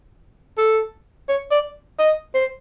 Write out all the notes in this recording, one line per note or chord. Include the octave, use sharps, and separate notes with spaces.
A4
C#5
D5
D#5
C5